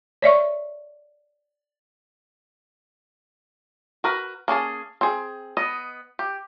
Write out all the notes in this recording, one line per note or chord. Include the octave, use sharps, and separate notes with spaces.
C#5 D5 E5 C#6
F#4 A#4 B4
A#3 C#4 G#4 A5
C4 G#4
B3 D#5
G4